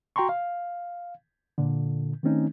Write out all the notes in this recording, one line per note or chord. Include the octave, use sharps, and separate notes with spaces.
F#4 G5 A#5 C6 C#6
F5
A#2 D3
D#3 A3 C4 C#4 D#4